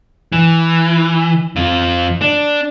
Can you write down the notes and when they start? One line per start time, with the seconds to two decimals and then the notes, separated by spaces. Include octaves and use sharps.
0.32 E3
1.56 F2 F4
2.21 D4